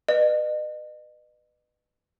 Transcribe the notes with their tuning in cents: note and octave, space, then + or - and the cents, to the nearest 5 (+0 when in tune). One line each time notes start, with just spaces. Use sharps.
B4 +0 D#5 -40